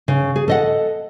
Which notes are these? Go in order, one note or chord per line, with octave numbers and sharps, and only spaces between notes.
C#3
G#4
A4 D#5 F#5